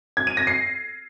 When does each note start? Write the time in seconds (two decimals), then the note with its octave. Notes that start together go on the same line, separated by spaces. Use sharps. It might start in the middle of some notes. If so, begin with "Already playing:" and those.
0.17 G#6
0.27 D#7
0.37 A#6
0.47 C7